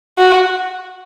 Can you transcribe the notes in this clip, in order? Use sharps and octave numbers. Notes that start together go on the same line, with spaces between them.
F#4